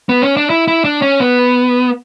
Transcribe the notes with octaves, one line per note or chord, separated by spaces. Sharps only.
B3
C#4
D4
E4
E4
D4
C#4
B3